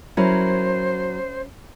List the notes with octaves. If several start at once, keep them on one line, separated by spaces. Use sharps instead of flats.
F#3 C#4 E4 A#4 C5